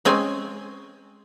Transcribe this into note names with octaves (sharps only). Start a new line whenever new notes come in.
G#3 C4 C#4 G#5